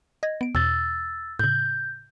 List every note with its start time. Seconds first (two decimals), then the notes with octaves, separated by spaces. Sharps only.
0.23 D#5 G#6 A#6
0.41 B3 D7
0.55 E2 B2 E6 A6
1.39 A2 C#3 G6